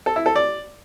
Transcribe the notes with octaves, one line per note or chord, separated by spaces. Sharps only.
A4
E4
A4
D5